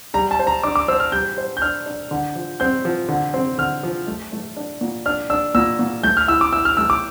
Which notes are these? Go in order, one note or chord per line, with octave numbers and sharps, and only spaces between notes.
G3 A#5
A5
C5
A#5
D4 D6
D6
C5 E6
F6
G3 G6
C5
G6
D4 F6
D4
D3
F3
C4 G6
F3
D3
C4
D3 F6
F3
A3
A3
D4
A#2
D4 F6
D4 E6
A#2 E6
A#2
A3 G6
F6
E4 E6
D6
E4 E6
F6
A3 E6
D6